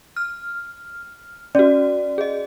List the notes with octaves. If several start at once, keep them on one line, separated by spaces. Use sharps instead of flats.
F6
C#4 F#4 D5
G#4 D#5